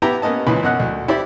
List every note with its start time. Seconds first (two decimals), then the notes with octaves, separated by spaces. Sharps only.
0.02 B3 E4 G4 B4 G5 A#5
0.22 A#3 B3 C#4 D#5 A5
0.47 C#2 A#2 E3 B4 B5
0.63 F#2 B2 D#5 F#5 F#6
0.80 D2
1.08 E4 G4 C5 D5 B5